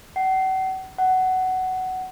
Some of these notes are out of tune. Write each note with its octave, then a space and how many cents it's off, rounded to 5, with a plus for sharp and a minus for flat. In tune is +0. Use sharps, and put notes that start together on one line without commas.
F#5 +40
F#5 +15